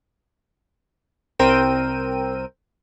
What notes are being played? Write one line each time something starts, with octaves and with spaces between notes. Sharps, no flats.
C2 C4 A#4 G5 E6 D#7